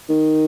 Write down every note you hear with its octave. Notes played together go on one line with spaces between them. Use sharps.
D#3